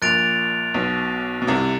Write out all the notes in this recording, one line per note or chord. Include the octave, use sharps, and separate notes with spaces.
A#1 A#2 F#6 A6 D7 F7
B1 B2
B2
C2 C3